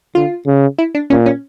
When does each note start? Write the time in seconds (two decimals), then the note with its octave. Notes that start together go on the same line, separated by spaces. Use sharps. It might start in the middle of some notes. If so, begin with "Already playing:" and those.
0.15 D3 F4
0.47 C#3
0.78 E4
0.95 D4
1.10 A#2 C#4
1.26 C#4